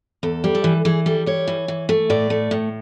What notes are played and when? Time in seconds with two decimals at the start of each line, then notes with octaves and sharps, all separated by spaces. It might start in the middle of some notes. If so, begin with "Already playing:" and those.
0.23 E2 A4
0.44 G3
0.55 A4
0.64 E3
0.85 E3 G#4
1.06 G3 A4
1.26 G3 C#5
1.47 E3
1.68 E3
1.89 A3
2.10 A2 D5
2.30 A3
2.51 A2